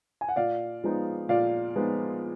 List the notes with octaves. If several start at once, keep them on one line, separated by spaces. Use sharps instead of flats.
G#5
F#5
A#2 D5 F5
F3 G#3 B3 D#4
A#2 D5 F5
F3 G#3 B3 D#4